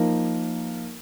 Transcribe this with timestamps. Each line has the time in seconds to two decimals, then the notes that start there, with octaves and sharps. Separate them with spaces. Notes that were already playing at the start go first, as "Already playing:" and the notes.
Already playing: F3 A#3 D#4 A#4